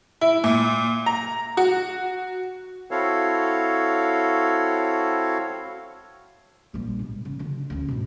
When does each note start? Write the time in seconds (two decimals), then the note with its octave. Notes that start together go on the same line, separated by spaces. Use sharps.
0.21 E4
0.44 A#2
1.06 A#5
1.57 F#4
2.91 C4 E4 F#4 A4 C#5 F5
6.74 A#1 G3
6.99 G#2 B2
7.25 C#3
7.39 D3 F#3
7.70 D2 C#4
7.88 G#2 B2